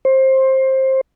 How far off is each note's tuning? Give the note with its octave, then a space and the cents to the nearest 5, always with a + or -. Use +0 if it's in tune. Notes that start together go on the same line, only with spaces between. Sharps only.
C5 +20